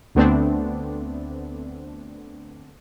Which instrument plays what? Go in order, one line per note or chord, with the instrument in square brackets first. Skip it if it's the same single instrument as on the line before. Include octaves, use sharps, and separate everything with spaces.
[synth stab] D2 D3 A3 B3 C4 D4